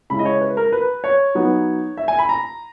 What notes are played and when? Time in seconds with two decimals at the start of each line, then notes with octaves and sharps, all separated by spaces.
0.10 C#3 G#3 C#4 E4 B5
0.19 D#5
0.25 C#5
0.41 B4
0.57 A#4
0.72 B4
1.04 C#5
1.35 F#3 B3 D#4
1.97 E5
2.08 G#5
2.19 B5
2.29 A#5